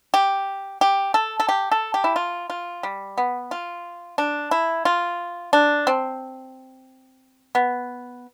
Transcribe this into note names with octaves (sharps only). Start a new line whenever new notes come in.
G4
G4
A4
A4
G4
A4
G4
E4
F4
F4
G3
B3
F4
D4
E4
F4
D4
C4
B3